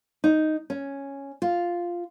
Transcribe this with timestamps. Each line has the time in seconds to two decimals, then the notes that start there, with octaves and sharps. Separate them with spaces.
0.24 D#4
0.70 C#4
1.42 F4